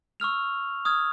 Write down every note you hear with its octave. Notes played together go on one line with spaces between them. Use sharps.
C#6 E6 F6 F7
D#6 F6 G#6